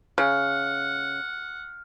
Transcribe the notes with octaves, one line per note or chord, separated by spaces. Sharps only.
C#3 F#5 F6